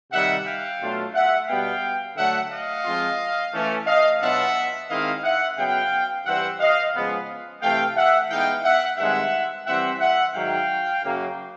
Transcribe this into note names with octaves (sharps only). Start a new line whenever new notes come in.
C3 D#3 G3 E5 F#5
F5 G5
B2 F#3 A3 D4 F4
E5 F#5
B2 G3 B3 F5 G5
D3 F#3 A3 E5 F#5
D#5 F5
F3 G#3 C4 F4
E3 A3 C#4
D#5 F5
B2 F#3 B3 D4 F4 E5 F#5
D#3 G#3 C4 E4 D#5 F5
E5 F#5
C#3 F#3 B3 F5 G5
G2 E3 G3 C4 E5 F#5
D#5 F5
C#3 F3 G#3 B3
C3 E3 A3 F5 G5
E5 F#5
E3 G#3 B3 D#4 F5 G5
E5 F#5
G2 D#3 G#3 C4 E5 F#5
E3 G3 C4 E5 F#5
E5 F#5
G#2 D#3 F#3 F5 G5
F#2 C#3 F#3 A#3